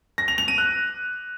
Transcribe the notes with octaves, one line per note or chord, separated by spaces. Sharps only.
A#6
F7
F7
D#7
F#6